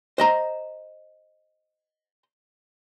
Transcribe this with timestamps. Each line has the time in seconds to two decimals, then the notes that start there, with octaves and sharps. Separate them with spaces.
0.18 C5 D#5 A#5